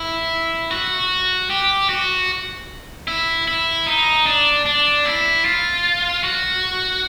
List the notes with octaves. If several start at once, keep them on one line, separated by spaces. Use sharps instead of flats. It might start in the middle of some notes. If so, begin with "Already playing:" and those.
Already playing: E4
F#4
G4
F#4
E4
E4
D#4
D4
D4
E4
F4
F#4